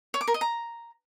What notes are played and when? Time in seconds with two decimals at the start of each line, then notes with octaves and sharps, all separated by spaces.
0.14 C#5
0.21 D6
0.28 A#4
0.34 D#5
0.41 A#5